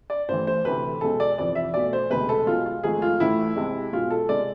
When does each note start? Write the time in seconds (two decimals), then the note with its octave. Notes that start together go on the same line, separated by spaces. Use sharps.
0.10 D5
0.29 A1 A2 E3 C5
0.47 C5
0.64 D2 C3 E3 A3 B4
1.01 B1 B2 G#3 A4
1.20 D5
1.38 F1 F2 E3 D5
1.55 E5
1.74 B1 B2 A3 D5
1.93 C5
2.10 E1 D2 C3 G#3 B4
2.29 A4
2.46 B1 B2 G#3 F4
2.66 F4
2.83 G#1 G#2 F3 A3 G#4
3.02 F4
3.20 A1 A2 E3 A3 E4
3.56 C2 C3 G#3
3.93 B1 B2 G#3 F4
4.10 A4
4.29 C3 G#3 D5